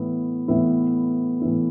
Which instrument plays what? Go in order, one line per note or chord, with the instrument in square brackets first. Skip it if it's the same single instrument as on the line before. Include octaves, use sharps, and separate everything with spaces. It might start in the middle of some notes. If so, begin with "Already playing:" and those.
Already playing: [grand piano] A2 E3 B3 E4
A2 E3 B3 E4
A2 E3 B3 E4